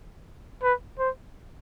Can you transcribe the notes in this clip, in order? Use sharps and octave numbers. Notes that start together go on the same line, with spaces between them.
B4
C5